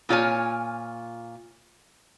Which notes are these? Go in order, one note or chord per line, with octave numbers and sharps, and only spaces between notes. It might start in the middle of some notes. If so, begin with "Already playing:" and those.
A#2 F4 C#5 G#5